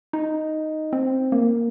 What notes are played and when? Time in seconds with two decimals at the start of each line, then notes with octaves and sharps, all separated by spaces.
0.13 D#4
0.93 C4
1.32 A#3